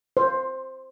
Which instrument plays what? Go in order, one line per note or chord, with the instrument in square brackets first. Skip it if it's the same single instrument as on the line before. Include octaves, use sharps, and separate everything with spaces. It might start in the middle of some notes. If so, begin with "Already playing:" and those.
[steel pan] C5